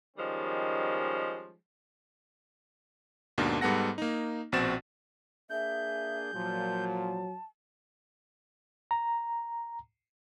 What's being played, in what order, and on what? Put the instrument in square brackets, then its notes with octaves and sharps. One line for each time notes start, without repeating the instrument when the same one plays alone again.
[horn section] D#3 F3 G3 G#3 C#4
[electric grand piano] D#2 G#2 B2 A#3 D4
G#2 G3 B3 A4 F#5 A#6
A#3 D#4
A#1 B2 C4 F#4 A6 E7
[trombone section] A#3 D4 G#4 [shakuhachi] E5 [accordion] G6
[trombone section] A#2 F3 [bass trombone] F#3 [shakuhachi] A5
[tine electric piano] A#5